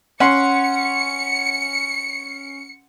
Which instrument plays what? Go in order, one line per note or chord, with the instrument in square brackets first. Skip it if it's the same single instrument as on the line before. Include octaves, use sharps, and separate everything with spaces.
[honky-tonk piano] C#4 [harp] F#5 C6 [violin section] C#7